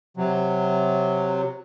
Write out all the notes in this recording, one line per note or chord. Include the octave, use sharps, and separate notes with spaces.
C3 F#3